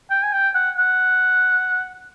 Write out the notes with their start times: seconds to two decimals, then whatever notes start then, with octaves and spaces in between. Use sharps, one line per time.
0.11 G5
0.24 G#5
0.33 G5
0.55 F#5
0.78 F#5